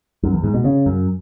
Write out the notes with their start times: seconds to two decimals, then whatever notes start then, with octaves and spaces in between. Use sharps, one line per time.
0.23 F#2
0.34 E2
0.44 G#2
0.54 B2
0.64 C#3
0.86 F#2